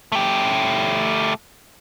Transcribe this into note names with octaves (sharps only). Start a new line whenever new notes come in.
A3 G4